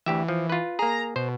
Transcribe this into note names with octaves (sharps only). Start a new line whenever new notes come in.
D2 E3 G4 E5
F3
F4 B4
A#3 G#4 A#5
B2 C5